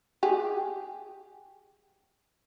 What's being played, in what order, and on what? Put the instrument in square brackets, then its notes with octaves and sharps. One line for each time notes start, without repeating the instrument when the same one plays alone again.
[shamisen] G4 G#4